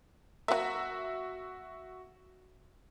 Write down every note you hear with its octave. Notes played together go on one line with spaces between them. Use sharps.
F#3 A#3 F#4 E5